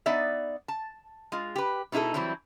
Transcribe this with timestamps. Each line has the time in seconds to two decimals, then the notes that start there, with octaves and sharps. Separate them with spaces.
0.06 B3 D#4 D5 E5
0.68 A5
1.32 G#3 F4
1.56 G4 B4
1.92 B2 D#4 E4 G#4 A4
2.14 E3 F#3 G3 C4 E4